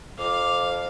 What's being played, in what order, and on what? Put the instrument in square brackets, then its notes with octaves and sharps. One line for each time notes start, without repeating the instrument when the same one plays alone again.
[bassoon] F2 [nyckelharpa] F5 [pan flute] D6